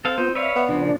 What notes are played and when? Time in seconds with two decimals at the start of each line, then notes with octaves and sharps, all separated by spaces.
0.05 C4 A4 F5
0.18 B3 D#4 F4 C5
0.35 B4 C#5 D5 E5 F5
0.56 B3
0.69 C#3 F3 D4
0.85 A#2